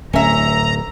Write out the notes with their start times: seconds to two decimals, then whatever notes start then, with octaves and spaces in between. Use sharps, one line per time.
0.13 D1 C#4 E5 A#5